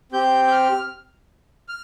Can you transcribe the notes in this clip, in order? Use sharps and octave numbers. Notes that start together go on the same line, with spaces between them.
C4 G4 G6
G6
F6
F6